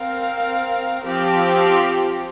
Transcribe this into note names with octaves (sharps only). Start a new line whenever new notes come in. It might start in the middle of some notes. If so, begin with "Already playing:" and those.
Already playing: C4 A#4 F5
F3 C4 G4